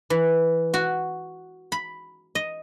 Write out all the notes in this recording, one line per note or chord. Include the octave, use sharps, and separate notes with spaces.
E3
F#4
B5
D#5